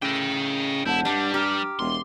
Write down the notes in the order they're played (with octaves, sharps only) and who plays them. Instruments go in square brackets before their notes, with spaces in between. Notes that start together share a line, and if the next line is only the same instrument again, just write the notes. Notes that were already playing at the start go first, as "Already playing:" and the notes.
[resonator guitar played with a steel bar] A2 [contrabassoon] C#3 [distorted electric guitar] D#5 G5
[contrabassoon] E1 [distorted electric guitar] E4 [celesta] F#5 A5 G6
[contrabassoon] G2 [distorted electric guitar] G3 [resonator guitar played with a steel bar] D4
[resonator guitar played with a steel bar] G4 [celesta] A#5 F6
[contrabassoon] E1 [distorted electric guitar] C6